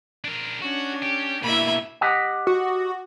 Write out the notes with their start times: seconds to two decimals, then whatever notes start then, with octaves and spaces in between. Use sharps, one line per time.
0.25 D4 A#4
0.62 C#4 D4 F#4
1.03 G4
1.43 G2 B2 A#3 E4 E5 B5
2.01 G4 D#5 F#5
2.47 F#4